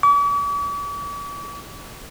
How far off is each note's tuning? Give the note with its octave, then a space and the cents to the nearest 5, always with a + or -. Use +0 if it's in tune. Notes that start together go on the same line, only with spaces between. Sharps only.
D6 -45